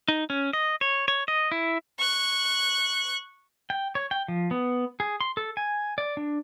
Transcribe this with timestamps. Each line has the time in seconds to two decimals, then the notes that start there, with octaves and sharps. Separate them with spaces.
0.08 D#4
0.30 C#4
0.53 D#5
0.81 C#5
1.08 C#5
1.28 D#5
1.52 E4
1.98 C#6 F#6
3.70 G5
3.95 C#5
4.11 G5
4.28 F3
4.51 B3
5.00 G#4
5.21 C6
5.37 A4
5.57 G#5
5.98 D5
6.17 D4